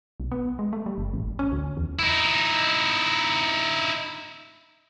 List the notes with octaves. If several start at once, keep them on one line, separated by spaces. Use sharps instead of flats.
B1
B3
G#3
A3
G3
F#1
A1
C#4
D2
E2
D#4 E4